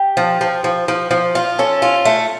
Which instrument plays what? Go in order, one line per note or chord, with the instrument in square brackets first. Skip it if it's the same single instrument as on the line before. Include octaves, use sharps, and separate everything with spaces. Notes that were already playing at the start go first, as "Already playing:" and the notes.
Already playing: [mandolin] G4
[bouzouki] F3
F3
F3
F3
F3
F4
[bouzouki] C#4 [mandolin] A4
[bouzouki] F4
A3